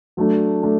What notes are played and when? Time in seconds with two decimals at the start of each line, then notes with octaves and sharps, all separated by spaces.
0.17 F#3 A3 D4
0.63 A3 D4